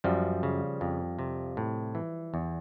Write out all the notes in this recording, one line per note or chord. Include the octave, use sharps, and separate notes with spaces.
F#2 F3 G3
C#3
F2
C3
A2
E3
E2